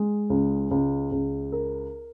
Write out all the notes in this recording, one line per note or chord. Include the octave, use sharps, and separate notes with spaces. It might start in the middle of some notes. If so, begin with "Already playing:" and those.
Already playing: G#3
C#2
C#2
C#2
A#4